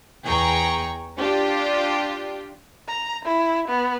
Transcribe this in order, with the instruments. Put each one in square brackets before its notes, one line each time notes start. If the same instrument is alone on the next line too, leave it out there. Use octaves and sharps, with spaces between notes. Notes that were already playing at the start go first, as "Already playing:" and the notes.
[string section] E2 G#4 G5 A#5 C#6
D4 F4 G4
[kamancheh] A#5
E4
B3